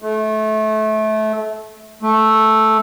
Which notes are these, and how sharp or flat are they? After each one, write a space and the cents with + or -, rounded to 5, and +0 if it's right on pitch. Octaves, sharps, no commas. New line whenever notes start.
A3 -25
A3 -5